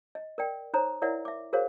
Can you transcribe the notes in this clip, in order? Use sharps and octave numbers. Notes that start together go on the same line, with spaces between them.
D#5
A#4 D5 G5
D#4 C5 C#5 A#5 D#6
E4 A#4 C#5 D5 E5 F#5
E5 D6
F#4 G#4 A#4 C5 C#5 F5